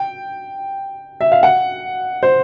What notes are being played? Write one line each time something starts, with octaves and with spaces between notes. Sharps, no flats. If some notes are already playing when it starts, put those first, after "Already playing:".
Already playing: G5
E5
F5
F#5
C5